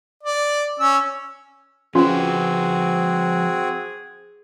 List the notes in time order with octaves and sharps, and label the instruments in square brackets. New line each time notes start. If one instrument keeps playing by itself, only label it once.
[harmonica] D5
C#4 E6
[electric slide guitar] F3 B4 [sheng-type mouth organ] C4 F#4 [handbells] C#4 F4 [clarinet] G#4